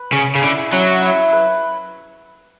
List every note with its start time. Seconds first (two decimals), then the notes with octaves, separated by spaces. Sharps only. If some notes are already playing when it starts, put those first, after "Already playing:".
Already playing: B4
0.12 C#3 C#4
0.35 C#3
0.42 D3 E4
0.72 F#3 C#4
1.02 E4
1.33 B4